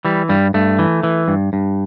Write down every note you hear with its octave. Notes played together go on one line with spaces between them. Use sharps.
E3 G3
G2 G3
G2 A3
E3
E3
G2
G2